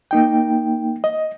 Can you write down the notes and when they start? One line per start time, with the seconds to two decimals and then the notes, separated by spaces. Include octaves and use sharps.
0.11 A#3 D#4 G5
1.04 D#5